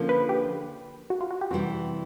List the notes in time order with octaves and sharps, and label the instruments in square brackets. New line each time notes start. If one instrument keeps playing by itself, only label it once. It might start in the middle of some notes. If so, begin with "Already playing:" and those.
Already playing: [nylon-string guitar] D3 F3 A#3 C#4
[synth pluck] B4
G4
F#4
F4
F#4
G4
[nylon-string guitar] C3 E3 G3 C4 [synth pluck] F#4